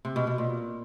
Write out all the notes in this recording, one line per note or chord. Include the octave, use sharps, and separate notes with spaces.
C3
B2
B2
A#2